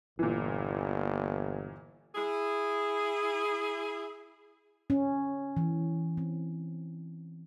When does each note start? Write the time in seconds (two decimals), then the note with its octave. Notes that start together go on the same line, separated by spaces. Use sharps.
0.19 G1 A#2 E3
2.15 E4 G#4
4.90 C#4
5.57 E3
6.17 C4